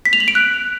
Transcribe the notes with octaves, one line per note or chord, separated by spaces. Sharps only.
B6
F7
F#7
D7
F#6